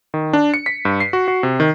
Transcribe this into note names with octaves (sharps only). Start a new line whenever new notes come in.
D#3
D4
C#7
B6
G2
C7
F#4
F#4
C3
D#3